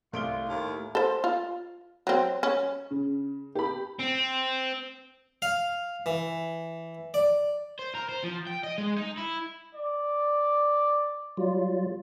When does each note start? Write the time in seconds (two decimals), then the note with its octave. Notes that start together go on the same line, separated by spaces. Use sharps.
0.13 C2 A3 F4 D7 G7
0.48 D#2 A2
0.95 A4 C5
1.24 F4
2.07 F#3 C4
2.43 C#4
2.91 C#3
3.55 G4 B5
4.00 C4
5.42 F5
6.06 E3
7.14 D5
7.79 C5
7.95 A#4
8.09 C5
8.24 F3
8.47 G5
8.64 D#5
8.78 G#3
8.98 D#4
9.17 E4
9.75 D5
11.37 F#3 G3 F4